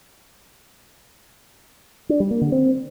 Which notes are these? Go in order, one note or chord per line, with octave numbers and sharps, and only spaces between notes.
D4
G3
A#3
D3
C4